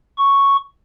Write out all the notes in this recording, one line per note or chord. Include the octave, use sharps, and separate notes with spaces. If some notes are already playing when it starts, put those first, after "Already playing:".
C#6